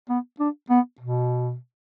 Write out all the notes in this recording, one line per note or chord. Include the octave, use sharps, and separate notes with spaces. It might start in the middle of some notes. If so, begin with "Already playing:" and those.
B3
D4
B3
B2